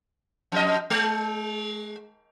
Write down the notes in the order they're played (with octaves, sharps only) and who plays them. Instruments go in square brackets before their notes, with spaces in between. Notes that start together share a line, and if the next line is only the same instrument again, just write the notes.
[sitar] F2 D#5
G#3